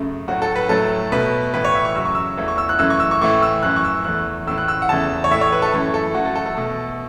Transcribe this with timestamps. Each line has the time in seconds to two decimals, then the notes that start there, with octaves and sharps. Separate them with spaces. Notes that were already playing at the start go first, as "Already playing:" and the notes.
Already playing: F#2 C#3 A3
0.28 A2 F#3 A3 F#4
0.42 A4
0.56 B4
0.69 A2 F#3 A3 A4
1.12 B2 A3 B4
1.53 A2 E3 A3 B4
1.65 C#5
1.75 E5
1.85 C#6
1.95 F#2 C#3 F#3 E6
2.05 C#6
2.15 E6
2.37 E2 E3 A3
2.48 C#6
2.58 E6
2.69 F#6
2.79 F#2 E3 A3 E6
2.90 C#6
3.00 E6
3.11 C#6
3.21 A2 E3 A3 C#6
3.42 E6
3.63 F#2 E3 A3 F#6
3.76 C#6
3.84 E6
4.04 E2 E3 A3 F#6
4.47 A2 E3 A3 E6
4.58 F#6
4.68 E6
4.82 F#5
4.89 E2 C#3 E3 A3 A5
5.24 C#5
5.31 A2 A3 E5
5.41 C#5
5.52 B4
5.62 A4
5.73 F#2 E3 A3
5.94 A4
6.15 F#2 E3 A3 F#4
6.25 A4
6.35 A4
6.46 A4
6.57 B2 A3